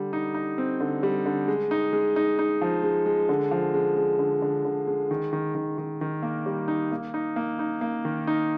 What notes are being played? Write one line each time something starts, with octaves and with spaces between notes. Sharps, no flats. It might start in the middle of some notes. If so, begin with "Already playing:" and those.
Already playing: D3 G3
D#4
D#4
C4
D3
G3
D3
G#3
D#4
G#3
D#4
D#4
F3
G#3
G#3
D3
F3
G#3
G#3
D3
D3
D3
G#3
D#3
D#3
D#3
D#3
D#3
A#3
G3
D#4
A#3
D#4
A#3
D#4
A#3
D#3
D#4